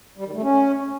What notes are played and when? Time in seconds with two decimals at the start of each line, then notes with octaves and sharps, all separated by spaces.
0.17 G3
0.26 D#3
0.34 A3
0.42 C#4